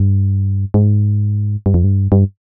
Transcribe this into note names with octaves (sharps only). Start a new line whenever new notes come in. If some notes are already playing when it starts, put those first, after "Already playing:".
Already playing: G2
G#2
G2
F2
G2
G2